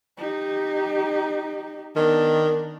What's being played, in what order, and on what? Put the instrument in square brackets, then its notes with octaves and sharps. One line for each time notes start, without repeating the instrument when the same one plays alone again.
[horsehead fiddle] D#4 G4
[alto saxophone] D#3 [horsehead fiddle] B3 D4